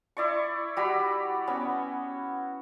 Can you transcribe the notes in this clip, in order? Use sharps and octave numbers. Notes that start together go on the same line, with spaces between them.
E4 D5 C#6
G3 F#4 B5
B3 C#4